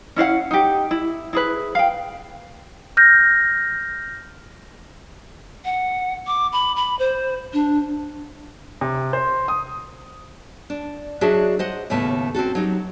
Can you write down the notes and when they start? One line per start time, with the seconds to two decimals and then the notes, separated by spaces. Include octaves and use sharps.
0.16 C#4 E4 F5 F#5
0.51 D#4 G4
0.91 E4
1.33 E4 G#4 B4
1.75 F5 G5
2.97 F6 G6 A#6
5.65 F#5
6.27 D6
6.53 B5
6.76 B5
6.99 C5
7.53 D4
8.81 C3
9.13 C5
9.48 D#6
10.70 D4
11.21 F#3 D4 F#4 G#4 D#5 E5
11.59 C5 D#5 F#5
11.90 D#2 A2 C#3 A3 B3
12.35 C4 C#4 F#4 A4
12.55 F#3 D#4 G4